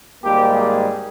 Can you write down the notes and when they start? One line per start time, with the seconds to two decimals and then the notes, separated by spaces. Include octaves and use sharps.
0.23 G#1 G#2 G3 A#3 G4
0.55 G#4